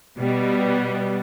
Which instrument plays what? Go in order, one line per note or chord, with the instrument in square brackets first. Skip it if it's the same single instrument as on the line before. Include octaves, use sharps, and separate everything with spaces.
[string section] B2 G3 B3